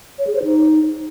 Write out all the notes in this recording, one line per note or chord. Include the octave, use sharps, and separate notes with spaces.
C#5
G#4
C5
D#4